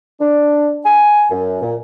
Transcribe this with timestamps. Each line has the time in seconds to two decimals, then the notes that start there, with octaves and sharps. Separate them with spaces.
0.20 D4
0.85 G#5
1.31 F#2
1.62 A#2